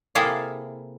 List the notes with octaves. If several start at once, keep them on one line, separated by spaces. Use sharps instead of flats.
C3 A#3 E4 G#4 A4 F5